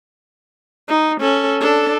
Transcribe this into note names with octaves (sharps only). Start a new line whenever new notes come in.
D#4
C#4 A4
D4 A4